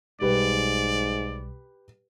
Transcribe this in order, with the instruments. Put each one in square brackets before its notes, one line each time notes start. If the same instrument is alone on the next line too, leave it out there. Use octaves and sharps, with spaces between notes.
[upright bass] B1 G3 [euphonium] G#2 [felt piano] G4 B4 [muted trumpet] D5